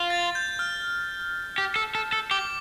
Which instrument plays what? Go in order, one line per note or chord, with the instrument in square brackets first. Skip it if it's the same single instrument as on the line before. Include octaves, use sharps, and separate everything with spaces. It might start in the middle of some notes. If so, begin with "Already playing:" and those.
Already playing: [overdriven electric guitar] F4
[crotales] A6
G6
F6
[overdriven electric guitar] G4
A4
A4
A4
[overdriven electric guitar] G4 [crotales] D6